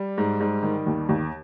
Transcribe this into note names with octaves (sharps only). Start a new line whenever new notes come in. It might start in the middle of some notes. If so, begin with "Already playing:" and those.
Already playing: G3
G#2
G#2
D#3
D#2
D#2